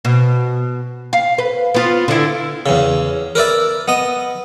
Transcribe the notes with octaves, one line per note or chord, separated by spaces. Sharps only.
B2
F5
B4
B3 F4
D3 E4
E2 C#3
A#4 B4 D5 E5
B3 D#5